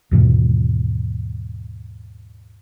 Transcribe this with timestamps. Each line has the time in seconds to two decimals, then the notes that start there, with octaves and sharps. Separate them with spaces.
0.11 D#2 G#2 B2 E3